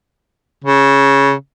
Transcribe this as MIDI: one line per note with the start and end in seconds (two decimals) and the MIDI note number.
0.64 1.32 49